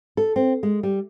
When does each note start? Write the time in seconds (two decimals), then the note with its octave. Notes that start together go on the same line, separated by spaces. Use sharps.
0.17 A4
0.36 C4
0.63 G#3
0.83 G3